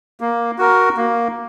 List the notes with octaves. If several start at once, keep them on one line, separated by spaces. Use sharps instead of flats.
A#3
F#4 A#4
A#3